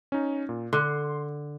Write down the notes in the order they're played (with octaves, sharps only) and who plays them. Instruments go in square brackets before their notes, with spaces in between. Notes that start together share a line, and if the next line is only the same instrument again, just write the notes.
[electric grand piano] C#4 D#4
A#2
[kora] D3 [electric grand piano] C6